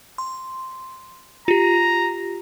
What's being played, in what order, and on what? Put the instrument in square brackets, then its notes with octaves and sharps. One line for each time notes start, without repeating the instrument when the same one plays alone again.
[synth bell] C6
[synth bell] F4 G4 [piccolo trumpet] A#5